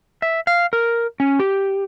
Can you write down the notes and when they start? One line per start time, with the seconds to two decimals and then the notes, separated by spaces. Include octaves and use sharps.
0.22 E5
0.47 F5
0.73 A#4
1.20 C#4
1.40 G4